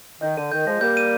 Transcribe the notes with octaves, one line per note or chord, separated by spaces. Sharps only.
D#3 G6
D3 D#7
D#3 G6
F3 G#3 A#6
G3 A#3 G6
D#7